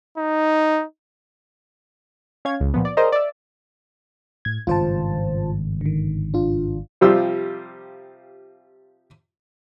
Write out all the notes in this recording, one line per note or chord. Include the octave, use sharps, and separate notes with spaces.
D#4
C#4 C#5 F5 G#6
C#2
A#2 F3 B3
D5
G#4 A#4 C5 D5 D#5 A#5
D5 E5
A2 G#6
G#1 G2 C#3 F4 C5 A5
D3 D#3
D4 F4
C3 F3 G3 F4 E6